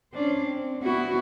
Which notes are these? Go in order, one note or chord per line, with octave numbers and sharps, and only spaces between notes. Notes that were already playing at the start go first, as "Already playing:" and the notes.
C#4 D4 C5
C4
B3 E4 F#4